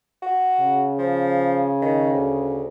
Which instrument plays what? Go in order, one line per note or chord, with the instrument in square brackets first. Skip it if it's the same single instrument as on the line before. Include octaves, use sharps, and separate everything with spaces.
[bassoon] F#4
[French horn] C#3
[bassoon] F3
D#3
D2